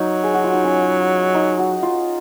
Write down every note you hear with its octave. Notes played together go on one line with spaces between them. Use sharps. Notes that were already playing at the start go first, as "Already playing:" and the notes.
Already playing: F#3 D#4
G#4
F#4
F4
D#4
C#4
D#4
F#4
F4